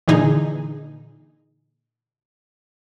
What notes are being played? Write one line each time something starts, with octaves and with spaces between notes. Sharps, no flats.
A#2 D3 E3 D#4 G#4